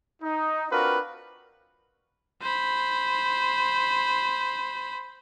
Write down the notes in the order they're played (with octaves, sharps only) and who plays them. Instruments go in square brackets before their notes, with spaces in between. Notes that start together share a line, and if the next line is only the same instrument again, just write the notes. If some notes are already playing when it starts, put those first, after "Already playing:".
[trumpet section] D#4
C4 D4 F4 F#4 A#4 B4
[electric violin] C5 B5